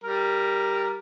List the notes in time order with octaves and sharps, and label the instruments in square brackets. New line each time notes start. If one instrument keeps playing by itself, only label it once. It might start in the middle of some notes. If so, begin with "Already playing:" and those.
[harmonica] G3 A#4